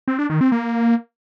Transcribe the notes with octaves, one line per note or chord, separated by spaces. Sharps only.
C4
D4
D#3
C4
A#3